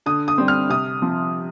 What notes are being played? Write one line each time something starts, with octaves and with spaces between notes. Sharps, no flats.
D3 D#6
D#6
G3 C4
F6
C3 D#6
F3 C4